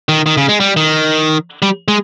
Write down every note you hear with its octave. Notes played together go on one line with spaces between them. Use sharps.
D#3
D#3
C#3
G#3
G3
D#3
G3
G#3